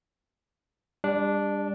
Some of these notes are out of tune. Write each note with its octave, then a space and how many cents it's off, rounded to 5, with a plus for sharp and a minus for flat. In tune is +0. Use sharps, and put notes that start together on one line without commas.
G3 +30 D4 -5